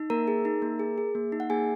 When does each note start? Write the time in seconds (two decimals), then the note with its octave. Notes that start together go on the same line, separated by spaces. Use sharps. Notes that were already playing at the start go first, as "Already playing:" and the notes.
Already playing: D#4
0.10 A#3 A#4 A#5
0.28 G#4
0.45 D#4
0.62 A#3
0.80 G#4
0.98 G#4
1.15 A#3
1.32 D#4
1.40 F#5
1.50 A#3 G#4 G#5